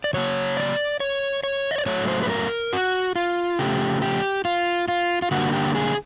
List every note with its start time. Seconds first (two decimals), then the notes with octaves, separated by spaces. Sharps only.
0.04 D5
0.13 C#3 F#3 A#3 C#5
0.57 D5
1.00 C#5
1.43 C#5
1.71 D#5
1.78 D5
1.86 A2 F#3 A3 C#5
2.08 C5
2.23 B4
2.30 A#4
2.73 F#4
3.16 F4
3.59 C#3 F3 A3 G4
4.02 G4
4.45 F4
4.88 F4
5.22 F4
5.31 D3 G3 A#3 F#4
5.53 G4
5.75 G#4